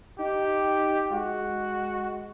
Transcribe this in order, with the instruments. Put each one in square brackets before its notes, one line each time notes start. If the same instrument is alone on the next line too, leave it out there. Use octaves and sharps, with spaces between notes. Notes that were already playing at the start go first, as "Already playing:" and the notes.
[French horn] D#4 [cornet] G4
[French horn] G#3 [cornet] F#4